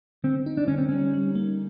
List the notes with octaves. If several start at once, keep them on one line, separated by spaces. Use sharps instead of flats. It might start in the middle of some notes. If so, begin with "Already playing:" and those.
D3 C4
D#4
D4
D3 C#4
C4
G3 C#4
G3
A#3